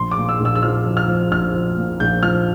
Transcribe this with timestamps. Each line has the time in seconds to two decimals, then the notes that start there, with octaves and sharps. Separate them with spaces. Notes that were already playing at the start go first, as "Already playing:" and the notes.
Already playing: A#1 C6
0.11 D6
0.17 A#2
0.29 E6
0.40 A#1
0.45 E6
0.55 E6
0.63 F3 F6
0.86 F3
0.97 F6
1.08 F3
1.31 A#1 F6
1.55 F3
1.77 A#2
2.00 A#1 G6
2.23 F3 F6